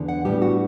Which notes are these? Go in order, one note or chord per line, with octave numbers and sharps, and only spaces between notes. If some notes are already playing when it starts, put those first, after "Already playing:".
Already playing: E2 D3
F#5
A2 G3 B3 D4 G4
F#4